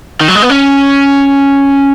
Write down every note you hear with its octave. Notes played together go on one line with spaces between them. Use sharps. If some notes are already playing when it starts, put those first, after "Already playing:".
D#3
F#3
G#3
B3
C#4